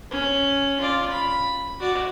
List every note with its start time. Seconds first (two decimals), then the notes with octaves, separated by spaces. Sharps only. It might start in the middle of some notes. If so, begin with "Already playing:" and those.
0.11 C#4
0.81 F4 D5
1.11 B5
1.80 F#4 D5